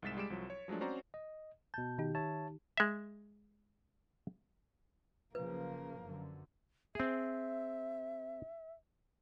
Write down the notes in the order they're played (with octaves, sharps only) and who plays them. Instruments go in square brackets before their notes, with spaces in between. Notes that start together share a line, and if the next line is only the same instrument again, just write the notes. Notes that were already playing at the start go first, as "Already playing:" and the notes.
[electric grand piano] C2 G#2 G#3 A6 B6 E7
G3 G#3 D6 D7 E7
C2 F3 F#3
C#5
F3 F#3 G#3 A3 D4
C4 C#4 F#4 C5 D5 A#5
[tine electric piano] D#5
[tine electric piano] B2 G6 [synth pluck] A5
[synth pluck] D#3 D#4 G4
[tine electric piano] C#5 E5 A5
[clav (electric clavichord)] G#3 E5
[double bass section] F#1 C#3 F3 [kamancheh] A#3 [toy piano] B4
[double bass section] F#2 D3
[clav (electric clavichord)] C4 G#4 [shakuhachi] E5